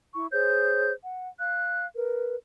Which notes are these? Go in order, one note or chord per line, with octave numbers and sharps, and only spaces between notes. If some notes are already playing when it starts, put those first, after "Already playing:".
E4 C#6
G#4 C5 C#5 G6
F#5
F5 F#6
A#4 B4